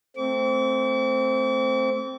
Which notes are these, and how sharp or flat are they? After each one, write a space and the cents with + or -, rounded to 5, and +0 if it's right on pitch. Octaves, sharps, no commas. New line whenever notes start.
A3 +0 C4 +0 D6 -45